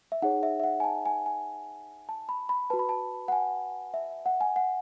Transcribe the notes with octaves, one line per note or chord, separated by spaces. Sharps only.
E5
D#4 G#4 C#5 F#5
E5
E5
F#5
G#5
A5
G#5
G#5
A5
B5
B5
F#4 B4 A5
B5
A5
F#5
G#5
E5
F#5
G#5
F#5